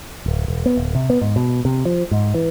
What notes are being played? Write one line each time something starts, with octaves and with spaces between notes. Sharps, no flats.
D1
E1
B3
D1
C3
B3
G#2
B2
C3
F3
G#2
E3